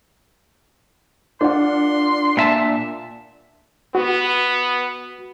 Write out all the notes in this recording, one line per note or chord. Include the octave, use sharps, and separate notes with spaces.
D4 F4 A#4 F#5 C6
A#2 E5 A5
B3 F#4